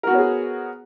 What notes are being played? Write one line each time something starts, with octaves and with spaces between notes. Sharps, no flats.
B3 F#4 G#4 A#4 C#5